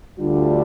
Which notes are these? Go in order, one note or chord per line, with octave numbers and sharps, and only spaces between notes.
D2 D3 G3 D4 F4